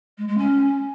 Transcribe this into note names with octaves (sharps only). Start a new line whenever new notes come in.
G#3
G#3
C#4